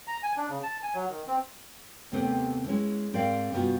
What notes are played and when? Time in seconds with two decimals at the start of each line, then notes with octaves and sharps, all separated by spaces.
0.07 A#5
0.23 G#5
0.37 D4
0.49 C#3
0.63 A5
0.83 G#5
0.94 F#3
1.10 D#3
1.27 C4
2.12 D#2 C3 A3 B3 C4
2.66 G#3 C#4 E4
3.13 G#2 C4 A#4 D5 F5
3.52 G2 C3 B3 F4 F#4